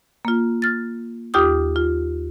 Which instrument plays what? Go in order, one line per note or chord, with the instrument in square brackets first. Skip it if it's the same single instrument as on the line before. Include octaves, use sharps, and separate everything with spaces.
[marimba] A#3 F4
F6 A6
D#2 F4 G4 D6 D#6
F4